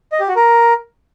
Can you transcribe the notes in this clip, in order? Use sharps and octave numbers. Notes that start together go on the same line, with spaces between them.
D#5
G4
F#4
A#4